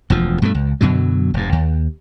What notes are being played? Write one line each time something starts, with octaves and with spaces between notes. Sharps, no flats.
E1 D2 F3
G2 B2 G3 A3
C#2
F#2 B2 D3 F#3
E1 G2
D#2